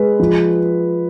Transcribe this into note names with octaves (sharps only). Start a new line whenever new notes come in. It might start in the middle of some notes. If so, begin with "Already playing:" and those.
Already playing: G#3 B4
F3